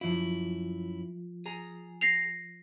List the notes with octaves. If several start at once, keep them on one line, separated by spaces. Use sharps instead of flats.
F#2 F3 E4 F4
G#4 A#5
A#6 C7 F7